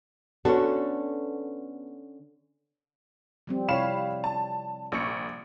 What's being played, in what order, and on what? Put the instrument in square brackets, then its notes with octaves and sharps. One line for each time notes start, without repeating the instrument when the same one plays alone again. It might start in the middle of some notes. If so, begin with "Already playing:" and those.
[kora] D3 C#4 [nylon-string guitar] B3 F#4 A4
[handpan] F3 G3 C4
[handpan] C3 E4 C#5 [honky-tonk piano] F5 B5 E7
[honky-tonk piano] A5
A#1 C#6 C#7